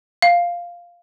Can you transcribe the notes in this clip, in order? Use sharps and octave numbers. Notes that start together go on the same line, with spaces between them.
F5